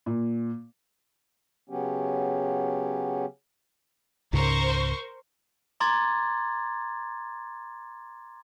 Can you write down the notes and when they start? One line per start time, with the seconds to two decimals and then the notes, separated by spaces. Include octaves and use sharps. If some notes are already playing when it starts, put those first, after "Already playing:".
0.06 A#2
1.70 C#3 F#3 B3 C#4 G4
4.33 C#2 G#2 C#3 A#4 C5 C#6
5.80 A#5 C6 D6 G#6 A6